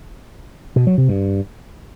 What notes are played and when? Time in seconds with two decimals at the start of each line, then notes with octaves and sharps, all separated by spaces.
0.76 B2
0.87 F#3
0.98 C3
1.09 G2